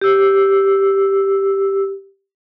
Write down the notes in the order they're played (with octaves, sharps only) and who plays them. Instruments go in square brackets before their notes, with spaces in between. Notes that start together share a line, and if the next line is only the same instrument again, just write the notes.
[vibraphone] G4 E6